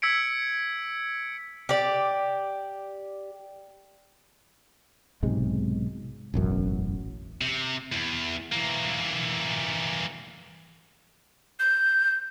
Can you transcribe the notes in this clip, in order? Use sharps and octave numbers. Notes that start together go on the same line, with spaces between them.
E6 G#6 B6 C#7 D7
G4 D5
B1 G#2 C3 G#3
E1 A1 F#2
C3
E2
E3 A#3
G6